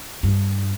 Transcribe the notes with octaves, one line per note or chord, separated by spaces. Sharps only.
G2